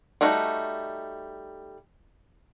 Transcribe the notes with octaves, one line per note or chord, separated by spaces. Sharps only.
G3 A3 D#4 F#4